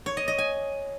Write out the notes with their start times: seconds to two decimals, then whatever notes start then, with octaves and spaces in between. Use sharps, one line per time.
0.06 C#5
0.17 D#5
0.28 D#5
0.38 G#5